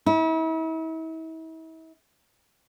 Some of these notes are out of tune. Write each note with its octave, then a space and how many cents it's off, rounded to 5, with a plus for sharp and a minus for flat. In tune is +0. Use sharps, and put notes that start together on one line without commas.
E4 -40